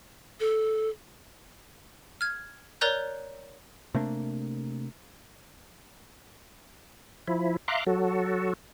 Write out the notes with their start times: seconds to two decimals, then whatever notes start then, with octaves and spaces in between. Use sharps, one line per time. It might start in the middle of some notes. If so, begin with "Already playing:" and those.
0.40 A4
2.21 F6 G#6
2.81 A#4 C#5 D5 A#5 F#6 G6
3.95 C3 A3 A#3 D4
7.28 F3 E4
7.68 E5 F5 A#5 C6 D6 F#6
7.87 F#3 F#4 A4